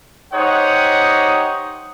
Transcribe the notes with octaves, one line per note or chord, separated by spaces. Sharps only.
D#4 G4 C5 C#5 F#5 D#6